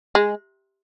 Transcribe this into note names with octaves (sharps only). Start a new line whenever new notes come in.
G#3